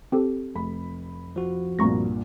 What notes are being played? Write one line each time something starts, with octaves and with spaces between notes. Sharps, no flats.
C4 G4 A4
F1 B5
F3 F#4
C2 G2 A#2 A#5 C#6 A#6